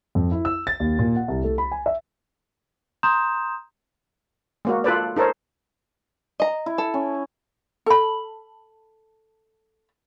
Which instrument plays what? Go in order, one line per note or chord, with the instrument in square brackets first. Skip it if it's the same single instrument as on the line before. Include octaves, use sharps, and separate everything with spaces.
[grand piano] F2
E4
E6
A6
D#2
A#2
F#5
C2
A3
B5
G#5
E5
[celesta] A#5 C6 D#6 G6 E7
[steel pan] G#3 A#3 F#4
F4 A4 B4 D5
D#4 A4 A#4 C5 C#5
[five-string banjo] D#5 A#5
[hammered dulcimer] E4
[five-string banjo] A4
[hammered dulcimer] C#4
[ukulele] A4 B5